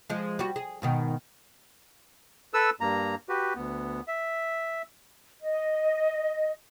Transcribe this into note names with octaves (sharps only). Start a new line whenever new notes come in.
F3 G#3
G3 F#4
G#4
G#2 B2 D#3
A4 B4 E6
G2 A#3 A#5
F#4 G4 B4
D2 B3
E5
D#5